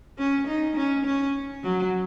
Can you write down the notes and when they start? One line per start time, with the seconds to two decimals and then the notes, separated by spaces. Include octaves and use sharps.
0.18 C#4
0.47 D#4
0.76 C#4
1.06 C#4
1.63 F#3